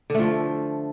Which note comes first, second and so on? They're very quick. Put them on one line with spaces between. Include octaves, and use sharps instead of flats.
D3 A3 F3